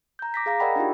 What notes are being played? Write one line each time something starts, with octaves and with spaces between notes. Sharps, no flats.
A#5 G6
D6 A#6 B6
G#4 F5 A#5 A#6
A#4 D5 D#5 F#5 G5 B5
D4 D#4 F4 G4